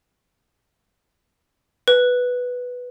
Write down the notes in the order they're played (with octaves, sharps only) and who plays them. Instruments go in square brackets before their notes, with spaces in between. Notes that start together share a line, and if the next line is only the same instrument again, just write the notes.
[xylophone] B4